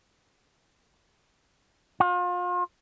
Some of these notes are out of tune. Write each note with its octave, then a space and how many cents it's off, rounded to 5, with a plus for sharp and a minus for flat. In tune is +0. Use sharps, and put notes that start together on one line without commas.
F4 +35